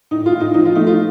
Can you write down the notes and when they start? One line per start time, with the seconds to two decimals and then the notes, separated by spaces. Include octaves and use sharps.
0.11 A2 D#4
0.26 F4
0.32 A2
0.40 D#4
0.54 F3 D#4
0.65 F4
0.75 A3 D#4
0.87 F4